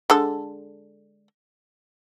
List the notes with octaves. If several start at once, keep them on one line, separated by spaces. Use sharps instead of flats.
D3 G#3 A4